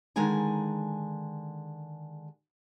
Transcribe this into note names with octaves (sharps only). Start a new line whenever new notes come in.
D3 D#3 G#3 G#4 G#5 A#5